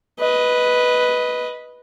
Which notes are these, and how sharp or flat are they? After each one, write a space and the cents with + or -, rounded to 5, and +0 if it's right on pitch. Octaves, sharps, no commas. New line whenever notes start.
B4 +0 D#5 +10